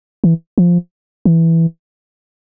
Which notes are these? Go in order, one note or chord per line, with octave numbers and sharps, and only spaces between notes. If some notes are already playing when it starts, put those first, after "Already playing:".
E3
F3
E3